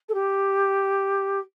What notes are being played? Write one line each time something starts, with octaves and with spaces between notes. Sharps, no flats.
A4
G4